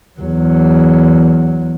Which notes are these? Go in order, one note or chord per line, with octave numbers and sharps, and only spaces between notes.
E2 F#3